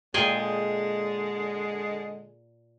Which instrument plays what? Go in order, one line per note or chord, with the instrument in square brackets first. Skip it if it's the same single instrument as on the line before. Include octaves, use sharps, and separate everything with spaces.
[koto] A#2 G#4 G5 [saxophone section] D3 G#3